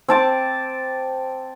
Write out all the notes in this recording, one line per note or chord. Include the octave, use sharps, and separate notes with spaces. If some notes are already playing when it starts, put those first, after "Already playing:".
C4 A5 D6